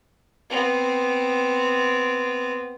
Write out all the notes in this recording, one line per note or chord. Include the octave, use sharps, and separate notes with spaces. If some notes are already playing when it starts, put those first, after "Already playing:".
B3 C4